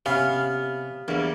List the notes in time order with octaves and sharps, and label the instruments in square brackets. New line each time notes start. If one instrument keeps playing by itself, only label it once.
[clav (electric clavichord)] C3 C#4 [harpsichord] B3 [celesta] G4 F6 [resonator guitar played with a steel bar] F5
[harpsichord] E2 [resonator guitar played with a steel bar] G3 A#3 [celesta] D4